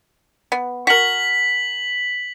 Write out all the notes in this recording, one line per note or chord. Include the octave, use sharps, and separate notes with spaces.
B3
F#4 A#4 B6 F#7